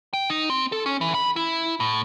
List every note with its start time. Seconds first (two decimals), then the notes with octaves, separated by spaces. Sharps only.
0.13 G5
0.30 D#4
0.50 C4
0.72 A4
0.86 C#4
1.01 E3
1.15 B5
1.36 E4
1.80 A2